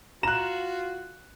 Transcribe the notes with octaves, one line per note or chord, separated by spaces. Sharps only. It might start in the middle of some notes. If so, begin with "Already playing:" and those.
F4 F#4 A#5 F#6 E7